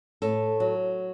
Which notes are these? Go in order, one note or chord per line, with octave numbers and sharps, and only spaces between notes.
A2 A4
F#3